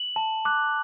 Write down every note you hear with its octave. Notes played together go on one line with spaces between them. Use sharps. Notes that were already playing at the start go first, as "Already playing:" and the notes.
Already playing: F#7
A5
D6 F#6